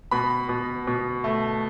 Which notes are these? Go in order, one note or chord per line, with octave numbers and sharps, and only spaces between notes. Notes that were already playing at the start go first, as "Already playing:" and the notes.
B2 B5
B2
B2
A3